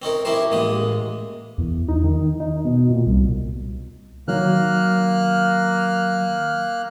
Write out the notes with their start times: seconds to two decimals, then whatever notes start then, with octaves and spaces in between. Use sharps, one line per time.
0.02 C4 C#4 D#4 A#4
0.25 C4 C#4 E4 G4 A#4 C5
0.52 A1 G#3 A#3 D#6
1.58 E2
1.88 D#4
2.04 D#3
2.40 D#4
2.65 B2
2.90 A#2
3.06 C2
4.28 D#3 F#3 A#3 F6 F#6